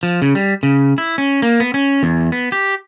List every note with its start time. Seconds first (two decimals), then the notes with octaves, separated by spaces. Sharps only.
0.03 F3
0.22 C#3
0.35 G3
0.63 C#3
0.98 E4
1.18 C#4
1.42 A#3
1.60 B3
1.74 C#4
2.03 E2
2.32 B3
2.52 G4